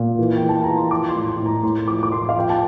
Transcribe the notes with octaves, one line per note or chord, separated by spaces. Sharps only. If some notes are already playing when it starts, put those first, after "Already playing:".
Already playing: A#2
E3
G5
E3
A5
E3 A#5
C6
F3 D6
C6
A2
C6
A2
A#5
A2 C6
F3 D6
D6
A2 C6
F5
F3 G5
A5